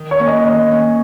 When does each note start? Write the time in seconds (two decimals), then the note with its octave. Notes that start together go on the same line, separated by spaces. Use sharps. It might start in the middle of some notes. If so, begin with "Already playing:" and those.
Already playing: D#3
0.11 C#5
0.19 A#3 C#4
0.28 D#5
0.45 D#3 D#5
0.71 A#3 C#4